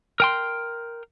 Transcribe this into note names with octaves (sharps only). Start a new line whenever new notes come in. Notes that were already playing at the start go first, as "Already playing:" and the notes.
A#4 G5 C6